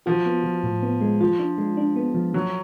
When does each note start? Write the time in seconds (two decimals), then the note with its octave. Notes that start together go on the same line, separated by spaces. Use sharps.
0.06 F3 F#4
0.26 B3
0.44 F3
0.63 A2
0.83 B3
1.01 G#3
1.21 F3 F4
1.39 D4
1.58 G#3
1.77 D4
1.96 B3
2.15 F3
2.34 F3 F#3